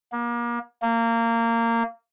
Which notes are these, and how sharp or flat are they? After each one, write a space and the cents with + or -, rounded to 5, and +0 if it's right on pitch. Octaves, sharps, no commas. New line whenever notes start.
A#3 +35
A#3 -20